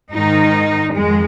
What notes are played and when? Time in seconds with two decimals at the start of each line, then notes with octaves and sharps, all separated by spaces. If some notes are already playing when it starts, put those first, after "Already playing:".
0.11 G#2 D#3 D#4
0.93 F2 D#3 G#3